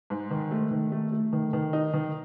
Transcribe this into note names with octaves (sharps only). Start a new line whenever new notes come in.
G#2
D#3
A3
D#3
A3
A3
D#3
D#3
D#4
D#3